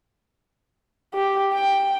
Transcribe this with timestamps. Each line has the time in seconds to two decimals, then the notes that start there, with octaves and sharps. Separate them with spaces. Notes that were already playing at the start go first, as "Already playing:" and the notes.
1.14 G4
1.53 G5